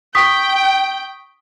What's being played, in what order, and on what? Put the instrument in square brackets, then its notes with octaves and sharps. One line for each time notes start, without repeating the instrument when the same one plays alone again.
[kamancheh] G5 [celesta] C#6 D#6 B6